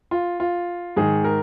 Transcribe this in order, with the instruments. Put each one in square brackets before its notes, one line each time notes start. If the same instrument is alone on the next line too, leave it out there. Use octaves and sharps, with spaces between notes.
[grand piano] F4
F4
G#2 D#3 G#4
A#4